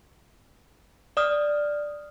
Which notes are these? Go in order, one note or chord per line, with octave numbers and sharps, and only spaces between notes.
D5 D#6 F6